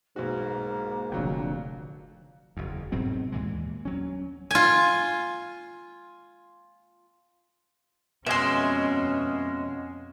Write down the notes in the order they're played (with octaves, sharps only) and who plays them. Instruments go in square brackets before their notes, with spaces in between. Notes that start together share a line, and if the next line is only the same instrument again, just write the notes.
[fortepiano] B1 F#4 [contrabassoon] G#2 [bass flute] A#3
[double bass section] F1 A#1 D3 [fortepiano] F2 F#3
[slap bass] F#1 E2
G#2 B2 F#3 C4
D#2 A#2 E3 G#3
F#3 C#4
[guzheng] F4 G#5
[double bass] F2 C#4 [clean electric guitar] B2 G#3 [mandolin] E5 C6